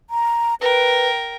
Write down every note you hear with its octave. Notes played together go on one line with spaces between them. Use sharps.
A#5
A#4 B4 G5